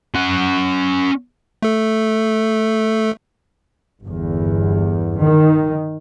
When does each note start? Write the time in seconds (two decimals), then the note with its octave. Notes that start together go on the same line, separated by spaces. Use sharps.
0.15 C#4 F#5
1.62 A3 A4
4.03 G1 E2
5.21 D#3